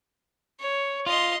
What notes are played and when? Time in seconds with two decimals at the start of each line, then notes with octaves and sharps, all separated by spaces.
0.60 C#5
1.06 F4 D#5 C6